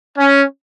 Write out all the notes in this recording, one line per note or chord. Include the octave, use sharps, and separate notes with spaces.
C#4